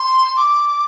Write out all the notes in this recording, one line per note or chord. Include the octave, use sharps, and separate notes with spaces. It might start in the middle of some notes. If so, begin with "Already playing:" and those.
Already playing: C6
D6